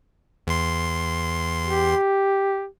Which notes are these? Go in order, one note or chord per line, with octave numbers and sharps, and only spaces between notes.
E2 C6
G4